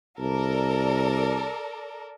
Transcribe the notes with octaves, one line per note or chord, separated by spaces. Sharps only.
C2 A4 A#4 D5